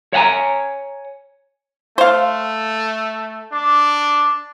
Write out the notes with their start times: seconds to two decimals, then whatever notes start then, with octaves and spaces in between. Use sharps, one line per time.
0.13 C#5 F5 F#5 G#5 A#5
1.98 A3 C5 F5
3.52 D4 D6